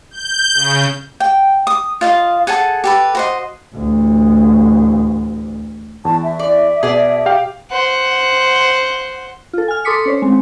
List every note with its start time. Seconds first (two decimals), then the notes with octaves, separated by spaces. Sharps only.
0.11 G6
0.54 C#3
1.20 G5
1.67 D#6
2.01 F4 D#5 F5
2.47 G#4 A4 F#5 A5
2.84 G4 A4 B4
3.15 F#4 C5 D#5
3.75 A1 D2
6.05 E2 A5
6.23 E5
6.39 D5
6.83 B2 G#4 D5
7.26 G4 F5 G5
7.71 C5 F#5
9.53 F4 A4
9.68 G#5 F6
9.85 A4 C6 D6 D#6 B6 C#7
10.06 C#4 C5 C#5
10.22 G#3 C4